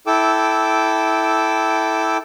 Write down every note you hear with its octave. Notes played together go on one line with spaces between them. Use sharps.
E4 A4 G5 D6 E6